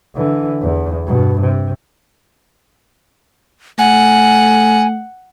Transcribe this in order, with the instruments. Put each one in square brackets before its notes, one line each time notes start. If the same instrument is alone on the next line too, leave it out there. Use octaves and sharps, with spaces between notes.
[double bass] D3 E3
E2
G2 B2
C3
[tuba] A3 [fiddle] F#5 [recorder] G#5